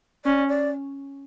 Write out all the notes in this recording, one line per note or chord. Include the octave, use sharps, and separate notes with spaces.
C#4 D5
D5